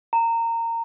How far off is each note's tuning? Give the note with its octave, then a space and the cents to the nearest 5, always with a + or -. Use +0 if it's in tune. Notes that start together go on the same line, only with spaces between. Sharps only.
A#5 -20